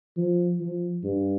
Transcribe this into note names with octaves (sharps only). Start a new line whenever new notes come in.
F3
F3
G2